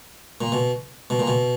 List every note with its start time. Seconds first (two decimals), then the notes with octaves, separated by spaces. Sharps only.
0.41 A#2
0.52 B2
1.10 B2
1.19 A#2
1.28 B2